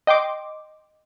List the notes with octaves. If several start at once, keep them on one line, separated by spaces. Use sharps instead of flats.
D#5 G5 C6 D6